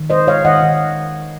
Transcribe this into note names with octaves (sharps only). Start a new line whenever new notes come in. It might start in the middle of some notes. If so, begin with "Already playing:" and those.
Already playing: D#3
G#3 C5 D#5
G#3 C#5 F5
D#3 D#5 F#5
D#3